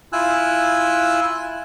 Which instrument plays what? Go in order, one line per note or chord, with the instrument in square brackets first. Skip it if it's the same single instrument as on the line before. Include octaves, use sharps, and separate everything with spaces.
[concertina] E4 F4 G#5 E6 F#6